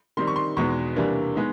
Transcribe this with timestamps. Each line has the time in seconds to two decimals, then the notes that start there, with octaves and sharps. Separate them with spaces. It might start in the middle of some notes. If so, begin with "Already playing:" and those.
0.17 D#3 G3 C4 D#4 C6
0.27 C#6
0.36 C6
0.57 E2 B2 G#3 B3 D#4 C#6
0.96 C3 E3 G3 A#3 D4
1.36 G#3 B3 D#4